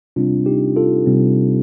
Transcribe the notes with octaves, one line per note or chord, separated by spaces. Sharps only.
C3 G3 C4 D4 F4
D#4 G4
F4 A4
C3 G3 C4